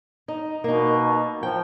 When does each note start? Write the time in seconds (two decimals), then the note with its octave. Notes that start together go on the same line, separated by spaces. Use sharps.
0.28 D#4
0.64 B2 A#3 D#4
1.43 F3 G5